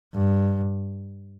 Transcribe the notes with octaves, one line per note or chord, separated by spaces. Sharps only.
G2